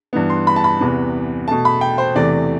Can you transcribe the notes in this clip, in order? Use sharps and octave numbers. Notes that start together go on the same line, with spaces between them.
G2 E3 B3
C6
B5
A5
B5
E2 C3 E3 B3
B2 A3 A5
B5
G5
C5
E2 C3 E3 A3 D5